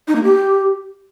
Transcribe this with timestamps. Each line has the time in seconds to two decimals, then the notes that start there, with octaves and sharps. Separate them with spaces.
0.08 D#4
0.16 A#3
0.23 G4